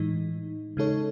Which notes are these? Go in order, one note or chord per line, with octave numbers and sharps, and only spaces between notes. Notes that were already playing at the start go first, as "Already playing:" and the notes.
Already playing: A2 E3 G#3 D#4
C#3 G#3 D#4 A4 C#5